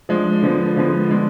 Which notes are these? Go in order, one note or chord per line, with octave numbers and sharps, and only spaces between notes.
F3 G#3 D4
D3 F3 G#3 B3
D3 F3 G#3 B3
D3 G#3 D4